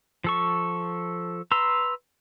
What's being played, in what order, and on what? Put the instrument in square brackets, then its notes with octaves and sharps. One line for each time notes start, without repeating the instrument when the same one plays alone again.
[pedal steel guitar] F3 A4 C#6
B4 A#5 C6 E6